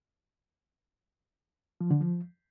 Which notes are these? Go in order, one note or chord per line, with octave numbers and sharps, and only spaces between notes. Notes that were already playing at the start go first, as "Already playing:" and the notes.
F3
D3
F3